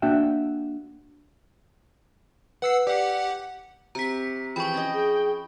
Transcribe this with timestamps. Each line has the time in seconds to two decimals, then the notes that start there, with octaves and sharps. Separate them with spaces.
0.02 A#3 D4 F#4 E5 G5
2.62 B4 F#5 E6 C7
2.87 G4 D5 F#5
3.95 C3 A#5 C#6 B6
4.56 E3 F3 G#4 G5 B5 C#6
4.74 C#4 D#5
4.93 G#4